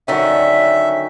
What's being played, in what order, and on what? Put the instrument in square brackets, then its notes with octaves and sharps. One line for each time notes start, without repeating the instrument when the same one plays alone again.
[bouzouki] D3 C#4 [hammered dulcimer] D#3 F#3 A4 [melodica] E5